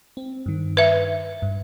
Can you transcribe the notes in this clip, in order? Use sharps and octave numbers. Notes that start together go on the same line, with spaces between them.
C4
G2 D#3
B4 E5
G2